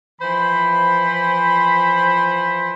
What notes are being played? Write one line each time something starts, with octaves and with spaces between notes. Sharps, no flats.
E3 F3 C5 B5